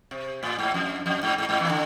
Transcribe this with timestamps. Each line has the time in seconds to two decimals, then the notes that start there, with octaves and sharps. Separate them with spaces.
0.11 C3
0.43 A2
0.59 G#2
0.74 F2
1.06 F2
1.23 G#2
1.38 G#2
1.49 G#2
1.59 E2 E3
1.70 D3